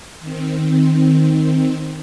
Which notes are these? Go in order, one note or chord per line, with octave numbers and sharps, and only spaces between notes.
D#3 C4